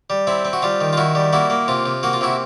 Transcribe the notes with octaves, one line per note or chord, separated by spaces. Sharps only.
G3
C4 E4
C4
F#4
G3 F4
D#3
F4
D#3 E4 F#4
G3
A#3 E4 F#4
A#3
C3 F4
C3
A#3 F#4
F4
C3 E4 F#4